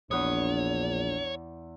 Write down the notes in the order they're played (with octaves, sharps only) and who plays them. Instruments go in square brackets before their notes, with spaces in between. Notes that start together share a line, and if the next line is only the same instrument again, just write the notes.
[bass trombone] A#1 [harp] E2 B4 D#6 [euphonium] D4 [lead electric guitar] C#5